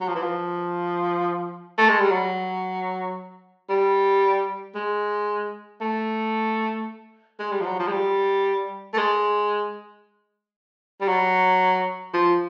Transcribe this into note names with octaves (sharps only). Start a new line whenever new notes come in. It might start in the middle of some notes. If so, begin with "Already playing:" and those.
F#3
F3
E3
F3
A3
G#3
G3
F#3
G3
G#3
A3
G#3
G3
F3
F#3
F3
G#3
G3
A3
G#3
G3
F#3
F3